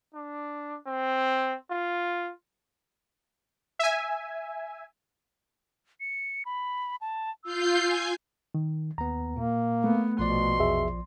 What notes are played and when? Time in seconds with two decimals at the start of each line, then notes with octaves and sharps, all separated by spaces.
0.14 D4
0.87 C4
1.71 F4
3.79 E5 G#5
6.00 C#7
6.45 B5
7.01 A5
7.44 F4 E6 G6 C7
7.83 G#5
8.55 D#3
8.98 D#2 B3 A#5
9.36 A#2 A#3
9.84 A3 B3
10.19 A#1 B2 F3 D5 C6
10.59 E2 G#4 E5